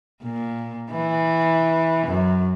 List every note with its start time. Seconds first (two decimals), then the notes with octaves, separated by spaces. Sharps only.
0.23 A#2
0.91 E3
2.07 F#2